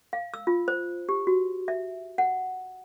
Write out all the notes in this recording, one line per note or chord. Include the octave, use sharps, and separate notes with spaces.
F5
E6
F4
C5
G4
F#4
E5
F#5